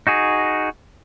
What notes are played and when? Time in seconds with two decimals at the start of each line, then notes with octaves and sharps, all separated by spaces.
0.07 D#4 F#4 G#4